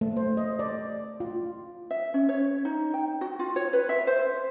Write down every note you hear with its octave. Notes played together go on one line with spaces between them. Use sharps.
A3
C5
D#5
D5
F4
E5
C#4
C#5
D#4
G5
F#4
F4
C#5
B4
E5
C5